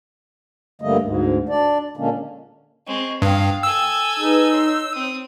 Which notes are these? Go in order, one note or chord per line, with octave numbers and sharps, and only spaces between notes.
G2 D3 G3 A3 A#3 D#5
D2 G#2
D4 D5
A#2 D3 G#3 A#3 C#4 D4
G#3 C4 D#5 C#6
G2 F5 G5 D#6
A4 G#5 E6
D#4 G#4 B4
C#5 C6
C4 D#6